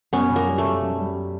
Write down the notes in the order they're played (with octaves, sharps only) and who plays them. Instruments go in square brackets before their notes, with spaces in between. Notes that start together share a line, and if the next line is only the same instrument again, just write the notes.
[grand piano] F#2 [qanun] B3 C#4
[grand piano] F#2
[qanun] A#3
[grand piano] G3
[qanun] A3
[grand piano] F#2
F#2
G3